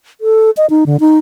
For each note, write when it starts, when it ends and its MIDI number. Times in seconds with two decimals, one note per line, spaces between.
0.21 0.50 69
0.57 0.66 75
0.70 0.84 63
0.86 0.97 50
1.00 1.19 63